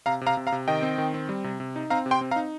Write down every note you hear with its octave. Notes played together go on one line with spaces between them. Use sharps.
C3 F5 A#5
C3
F5 A#5
C3
F5 A#5
C3
D#3 D#5 G5
C4
D#3
C4
G3
C3
C3
D#4
C4 F5 A#5
C3
G5 C6
C4
F5 A#5
D#4